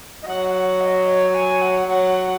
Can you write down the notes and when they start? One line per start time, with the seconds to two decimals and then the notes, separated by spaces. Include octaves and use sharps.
0.22 D#5
0.28 F#3 F#5
0.54 F#5
0.81 D#5
1.08 C#5
1.34 G#5
1.62 F#5
1.88 F#3 F#5